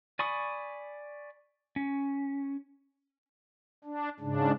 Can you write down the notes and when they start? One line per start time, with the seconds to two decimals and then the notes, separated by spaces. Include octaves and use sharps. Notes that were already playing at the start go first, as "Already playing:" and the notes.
0.19 D5 G#5 B5 C#6 D#6
1.76 C#4
3.84 D4
4.20 G#2 C#3 D4